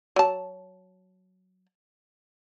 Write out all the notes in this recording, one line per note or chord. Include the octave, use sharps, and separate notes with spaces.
F#3 A5